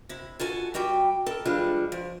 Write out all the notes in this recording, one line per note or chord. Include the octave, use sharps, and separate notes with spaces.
C3 E4
F4 F#4 A4 G#5
G3 F#4 G4 G5
A4 A#4
E3 G3 G#3 D4 F4
F3